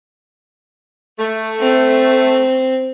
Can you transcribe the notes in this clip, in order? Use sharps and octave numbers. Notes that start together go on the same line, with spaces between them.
A3
C4